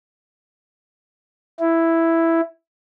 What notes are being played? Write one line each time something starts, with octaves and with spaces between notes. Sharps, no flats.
E4